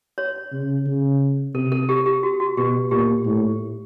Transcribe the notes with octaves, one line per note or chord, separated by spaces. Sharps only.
C#5
C#3
C#3
C3 A4
A4
G4
G4
F#4
F#4
B2 G4
A#2 G4
A2